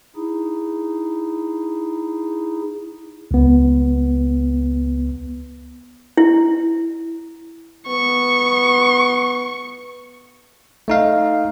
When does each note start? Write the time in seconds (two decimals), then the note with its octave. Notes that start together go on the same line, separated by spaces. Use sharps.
0.16 D#4 E4 G#4
3.31 C#2 B3
6.17 E4
7.88 B3 C#6
10.88 A3 D#4 F5